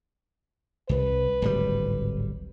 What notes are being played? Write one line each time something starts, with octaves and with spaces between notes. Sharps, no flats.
C2 B4
D1 G#1 G3